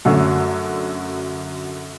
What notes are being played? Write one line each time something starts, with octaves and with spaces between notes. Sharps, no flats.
F#2 D3 F#3 A3 C#4